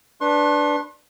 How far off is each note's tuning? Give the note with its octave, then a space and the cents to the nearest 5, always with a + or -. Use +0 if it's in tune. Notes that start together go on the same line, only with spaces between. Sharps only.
D4 +0 B4 +0 C6 +45